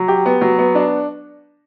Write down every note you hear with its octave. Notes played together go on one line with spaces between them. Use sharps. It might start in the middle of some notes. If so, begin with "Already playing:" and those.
Already playing: F#3
G4
B3
F#3
B3
D4